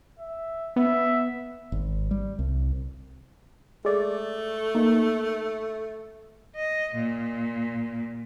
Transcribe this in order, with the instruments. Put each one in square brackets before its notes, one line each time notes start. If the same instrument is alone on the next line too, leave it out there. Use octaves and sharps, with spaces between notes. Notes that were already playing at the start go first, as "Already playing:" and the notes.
[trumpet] E5
[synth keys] B3 [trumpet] E5
[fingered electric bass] G#1
G3
C2
[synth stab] G#3 D5 [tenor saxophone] A3
[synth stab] A#3 D#4
[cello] D#5
A#2